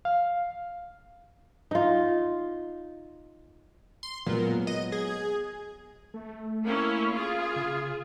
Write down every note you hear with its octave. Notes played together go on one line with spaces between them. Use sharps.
F5
D#4 F4
C6
A#2 F#3 G#3 B3
D#5
G#4
A3
A#3 C#4 E4
F4 G#4
C#3